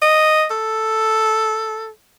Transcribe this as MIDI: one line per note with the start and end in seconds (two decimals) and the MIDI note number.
0.02 0.45 75
0.51 1.88 69